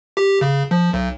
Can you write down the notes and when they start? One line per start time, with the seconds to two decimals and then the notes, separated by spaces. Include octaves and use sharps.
0.17 G4
0.41 C#3
0.71 F3
0.94 B1